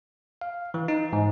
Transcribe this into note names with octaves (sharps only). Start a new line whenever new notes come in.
F5
E3
D#4
G#2